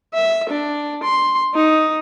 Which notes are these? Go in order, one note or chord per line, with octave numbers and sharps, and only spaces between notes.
E5
D4
C6
D#4